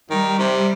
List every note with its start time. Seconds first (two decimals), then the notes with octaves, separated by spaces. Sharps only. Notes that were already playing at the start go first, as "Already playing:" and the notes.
0.10 D#3 G3
0.39 C3